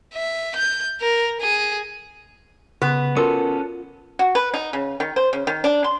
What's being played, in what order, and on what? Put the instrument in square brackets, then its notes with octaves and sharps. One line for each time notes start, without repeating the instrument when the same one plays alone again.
[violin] E5
G6
A#4
G#4
[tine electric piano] C#3 [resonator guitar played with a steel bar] B3 [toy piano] G4
[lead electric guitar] C#4 A4 [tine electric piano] F4 [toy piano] F#4 A#4 D6
[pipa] F#4
B4
D#4
C#3
D#3
C5
C#3
D#3
D4
C6